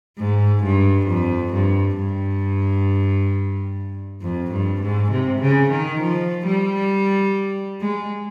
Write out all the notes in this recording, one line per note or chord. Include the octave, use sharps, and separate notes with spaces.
G#2
G2
F2
G2
G2
F2
G2
G#2
C3
C#3
D#3
F3
G3
G#3